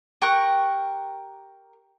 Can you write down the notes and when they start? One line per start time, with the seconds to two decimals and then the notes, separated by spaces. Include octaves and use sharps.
0.22 G4 A#4 C#6 F#6